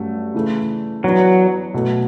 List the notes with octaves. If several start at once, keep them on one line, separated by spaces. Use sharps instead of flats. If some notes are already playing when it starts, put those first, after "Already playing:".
Already playing: G2 F#3 A3 C#4 G4
C#3 E3 A3
E3 F#3 B3 D4
B2 F#3 A3